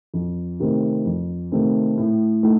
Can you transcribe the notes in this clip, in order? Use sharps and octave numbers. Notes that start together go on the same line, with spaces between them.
F2
C3 D#3 A3 C4
F2
C3 D#3 A3 C4
A2
A3 D#4